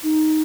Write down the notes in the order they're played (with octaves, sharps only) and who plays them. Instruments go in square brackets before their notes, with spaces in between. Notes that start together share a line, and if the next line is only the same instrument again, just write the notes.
[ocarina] D#4